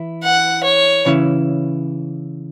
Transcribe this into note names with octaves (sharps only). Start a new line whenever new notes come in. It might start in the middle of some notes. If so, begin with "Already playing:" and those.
Already playing: E3 E4
F#5
C#5
C#3 E3 C#4 E4